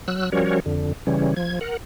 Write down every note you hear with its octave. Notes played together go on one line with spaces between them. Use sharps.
F#3 E6 F#6
F3 G3 C#4 F#4 A#4 C#5
F2 D3
C#3 E3 G3 C#4
F3 G#6
A#4 F#5